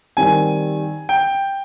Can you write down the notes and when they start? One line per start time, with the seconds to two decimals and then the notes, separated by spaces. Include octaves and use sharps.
0.17 D#3 G3 C4 G#5
1.09 G5